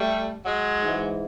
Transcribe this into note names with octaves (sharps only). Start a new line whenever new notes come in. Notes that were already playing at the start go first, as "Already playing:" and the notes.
Already playing: G3 A3
F#3 G#3
G#2 E3